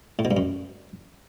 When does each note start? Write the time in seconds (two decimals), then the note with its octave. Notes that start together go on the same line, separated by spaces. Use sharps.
0.19 A2
0.25 B2
0.31 G2
0.37 F#2